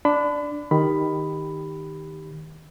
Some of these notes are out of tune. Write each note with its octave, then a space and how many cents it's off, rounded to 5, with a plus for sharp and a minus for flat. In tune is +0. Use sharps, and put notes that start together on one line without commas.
D4 +0 B5 +35
D#3 +0 G4 +0 B5 +10